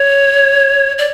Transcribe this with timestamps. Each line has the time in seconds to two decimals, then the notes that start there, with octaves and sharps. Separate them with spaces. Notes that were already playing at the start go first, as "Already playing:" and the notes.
Already playing: C#5
0.98 D5